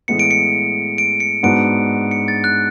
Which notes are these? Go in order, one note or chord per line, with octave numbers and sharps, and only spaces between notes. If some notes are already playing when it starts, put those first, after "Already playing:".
A2 E3 G#3 B3 C#7
D7
C#7
D7
C#7
G#2 G#3 B3 D4 F#4 D7
C#7
A6
F#6